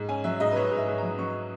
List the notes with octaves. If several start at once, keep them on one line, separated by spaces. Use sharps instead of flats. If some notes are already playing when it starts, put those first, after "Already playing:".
Already playing: G#2
C#4 G#5
F#3 E5
G#2 D#5
B4
G#2 C#5
G#2
E5
G#2
A#5
F#3
F#3 C#6